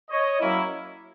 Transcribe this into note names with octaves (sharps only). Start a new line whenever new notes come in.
C#5 D#5
F#3 A#3 C#4 E4